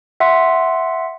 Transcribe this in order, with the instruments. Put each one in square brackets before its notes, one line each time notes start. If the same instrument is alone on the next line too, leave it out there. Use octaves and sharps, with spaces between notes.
[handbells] E5 F#5 C6